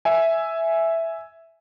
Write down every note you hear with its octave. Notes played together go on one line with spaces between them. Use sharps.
E5 G#5